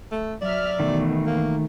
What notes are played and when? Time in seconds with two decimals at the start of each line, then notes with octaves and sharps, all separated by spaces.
0.11 A3
0.41 F#3 D5 E5 F6
0.80 B2 D#3 E3 A3
1.26 A#3